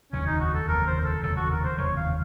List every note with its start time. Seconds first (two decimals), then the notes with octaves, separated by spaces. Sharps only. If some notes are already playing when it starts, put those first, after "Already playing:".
0.13 F1 D#2 C#3 F#3 C#4
0.27 D#4
0.41 F#4
0.54 A4
0.68 F1 D#2 C#3 F#3 A#4
0.87 C5
1.00 A#4
1.05 A4
1.23 F1 D#2 C#3 F#3 A4
1.37 F#4
1.51 A#4
1.64 C5
1.78 F1 D#2 C#3 F#3 C#5
1.97 F5